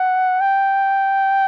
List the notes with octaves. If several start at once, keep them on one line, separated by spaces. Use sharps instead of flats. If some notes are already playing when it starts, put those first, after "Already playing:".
Already playing: F#5
G5